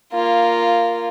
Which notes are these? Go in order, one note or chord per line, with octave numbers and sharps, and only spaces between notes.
A#3 F4